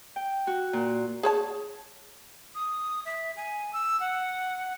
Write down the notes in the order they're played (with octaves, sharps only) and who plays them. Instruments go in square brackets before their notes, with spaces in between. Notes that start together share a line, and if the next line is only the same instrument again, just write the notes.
[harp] G5
F#4
A#2
[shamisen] G#4 C#5 A5
[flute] D#6
E5
G#5
E6
F#5